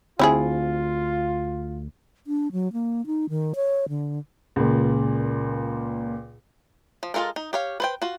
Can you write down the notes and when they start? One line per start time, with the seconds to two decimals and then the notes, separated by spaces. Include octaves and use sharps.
0.19 D2 C4 E4 F4 G#4
2.27 D4
2.52 F#3
2.73 A#3
3.06 D#4
3.30 D#3
3.55 C#5
3.89 D3
4.56 C#2 A#2
7.03 F3
7.14 G#3 C#4 F4 A4 A#4
7.36 D#4
7.53 G4 C#5 F5
7.80 B4 C5 G5
8.02 F4 F#4